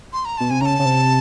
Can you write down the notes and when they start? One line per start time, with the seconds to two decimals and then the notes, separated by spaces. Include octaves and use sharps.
0.13 C6
0.25 A#5
0.38 B2 A5
0.50 C3 G#5
0.61 C#3 A5 A#5
0.79 C#3
0.85 C3